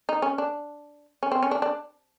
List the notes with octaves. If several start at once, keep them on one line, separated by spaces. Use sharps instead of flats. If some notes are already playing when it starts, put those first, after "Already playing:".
D#4
C#4
D4
C#4
C4
C#4
D4
D4